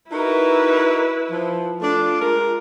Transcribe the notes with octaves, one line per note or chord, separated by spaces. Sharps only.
D#4 E4 F#4 A#4 B4
F3
A3 D4 F4
G#3 A#4